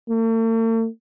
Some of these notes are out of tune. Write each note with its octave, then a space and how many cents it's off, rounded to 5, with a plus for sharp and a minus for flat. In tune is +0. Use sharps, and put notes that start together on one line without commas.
A3 +45